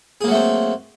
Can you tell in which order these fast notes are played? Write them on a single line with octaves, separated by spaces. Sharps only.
G#4 A#3 F#3 A3 C4